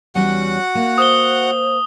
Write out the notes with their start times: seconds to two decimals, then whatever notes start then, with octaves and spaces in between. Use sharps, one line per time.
0.15 E2 G3 C#4 F#4 F#5
0.75 A#3
0.98 C5 D#6 G7